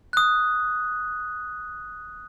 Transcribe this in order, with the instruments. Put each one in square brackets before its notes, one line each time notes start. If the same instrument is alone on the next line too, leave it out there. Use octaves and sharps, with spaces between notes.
[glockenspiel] D#6 F#6